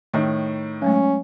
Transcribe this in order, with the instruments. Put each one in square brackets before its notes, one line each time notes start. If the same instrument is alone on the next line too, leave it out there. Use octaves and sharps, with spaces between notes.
[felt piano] A2 D#3
[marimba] F#3 G#3 A3 [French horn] C#4